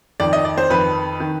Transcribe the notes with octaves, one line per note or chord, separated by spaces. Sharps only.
F2 D#3 D5
D#5
D5
C5
F2 D#3 B4
D#3